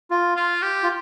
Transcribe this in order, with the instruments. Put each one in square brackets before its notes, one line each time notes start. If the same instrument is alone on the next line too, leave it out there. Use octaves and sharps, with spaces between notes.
[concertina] F4
[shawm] F4
G4
[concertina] F4